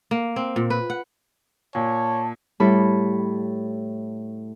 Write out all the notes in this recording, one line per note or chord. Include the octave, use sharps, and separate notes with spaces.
A#3
C4
A#2
B4
F#5
A#2 C#5 A5
A2 G3 E4 A4 B5 D6